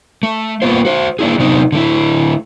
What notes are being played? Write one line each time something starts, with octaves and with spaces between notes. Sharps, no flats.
A3
A#3 B3 F4 C5
F#4 C5
A#3 D4 E4 G#4
C3 F#3 B3 C4 D4 D#4
D3 A3 E4